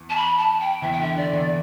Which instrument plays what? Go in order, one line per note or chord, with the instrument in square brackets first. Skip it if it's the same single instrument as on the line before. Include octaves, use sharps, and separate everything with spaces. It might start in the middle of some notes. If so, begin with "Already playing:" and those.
Already playing: [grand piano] E2 E3
[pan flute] A5
B5
A5
G5
[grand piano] E2 E3 [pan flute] E5
[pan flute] G5
[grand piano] D3 [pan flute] E5
[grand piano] D3 [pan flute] D5
[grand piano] E2 E3